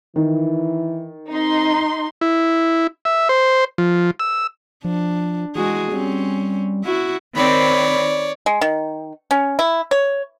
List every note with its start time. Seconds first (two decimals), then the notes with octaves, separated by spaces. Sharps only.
0.16 D#3 E3
1.31 C4 D#4 C6
2.21 E4
3.05 E5
3.29 C5
3.78 F3
4.20 E6
4.85 F3 D4
5.55 E3 G#3 F#4 G#4
5.92 G3 C4 C#4
6.84 E4 F#4
7.36 D#3 C4 C#5 D5 B5
8.46 G#3
8.61 D#3
9.31 C#4
9.59 E4
9.91 C#5